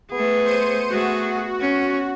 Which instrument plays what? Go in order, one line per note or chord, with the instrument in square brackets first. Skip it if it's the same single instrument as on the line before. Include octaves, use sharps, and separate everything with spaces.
[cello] A3 G#4 [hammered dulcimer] B3
[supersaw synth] C5 C#7 D#7
[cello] A3 G#4 [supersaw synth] F#4
[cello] C#4